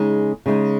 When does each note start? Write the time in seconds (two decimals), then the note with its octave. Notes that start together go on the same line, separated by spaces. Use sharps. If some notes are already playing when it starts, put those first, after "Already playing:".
Already playing: C#3 G#3 D#4
0.46 C#3 G#3 D#4